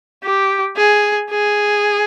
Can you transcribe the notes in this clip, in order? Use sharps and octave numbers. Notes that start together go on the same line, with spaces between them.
G4
G#4
G#4